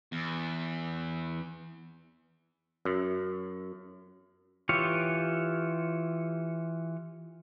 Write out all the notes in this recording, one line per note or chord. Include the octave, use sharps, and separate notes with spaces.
E2
F#2
E3 F4 G4 C#5